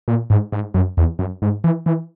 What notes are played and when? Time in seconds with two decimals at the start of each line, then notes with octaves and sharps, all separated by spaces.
0.08 A#2
0.30 G#2
0.52 G#2
0.74 F#2
0.97 E2
1.19 F#2
1.42 G#2
1.64 E3
1.86 E3